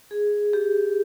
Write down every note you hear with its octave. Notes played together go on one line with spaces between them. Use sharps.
G#4
G4